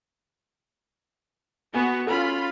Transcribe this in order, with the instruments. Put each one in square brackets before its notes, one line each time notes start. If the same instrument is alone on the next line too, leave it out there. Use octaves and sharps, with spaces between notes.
[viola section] B3 F#4 [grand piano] G#5
[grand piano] C#4 A4 [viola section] F4 B5